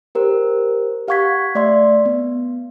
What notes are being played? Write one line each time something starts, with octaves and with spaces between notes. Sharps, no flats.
G4 A#4 C5
G4 F5 F#5 C#6 G#6 B6
A3 D5 E5 C6
B3